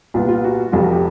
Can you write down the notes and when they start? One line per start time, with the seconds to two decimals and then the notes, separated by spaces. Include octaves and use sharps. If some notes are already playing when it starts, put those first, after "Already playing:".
0.14 C2 A#2 G3 B3 F4
0.28 F4
0.44 F#4
0.72 F1 F2 C3 F3 F4
0.82 F#4
0.92 G4